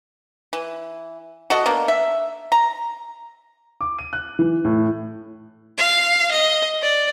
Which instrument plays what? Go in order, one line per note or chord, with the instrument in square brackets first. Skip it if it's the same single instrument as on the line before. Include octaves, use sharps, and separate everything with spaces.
[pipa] E3
F#4 A4 D#5
A#3 B3 D4
E5
A#5
[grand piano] D6
D#7
F#6
E3
A2
[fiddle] F5
D#5
D5